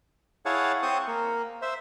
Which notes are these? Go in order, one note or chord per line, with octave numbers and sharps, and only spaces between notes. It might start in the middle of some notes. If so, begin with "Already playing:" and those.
E4 G#4 C#5 F5 F#5 A5
C4 C5 C#6 D#6
A#3
C5 E5